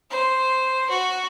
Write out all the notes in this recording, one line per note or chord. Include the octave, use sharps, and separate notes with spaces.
C5
F#4